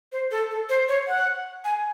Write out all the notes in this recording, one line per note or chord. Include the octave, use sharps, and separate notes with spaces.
C5
A4
A4
C5
C#5
F#5
G#5